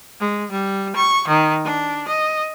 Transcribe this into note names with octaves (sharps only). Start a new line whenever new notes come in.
G#3
G3
C#6
D#3
D4
D#5